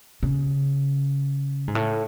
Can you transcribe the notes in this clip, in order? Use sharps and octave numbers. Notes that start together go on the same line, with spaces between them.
C#3
G#2
A2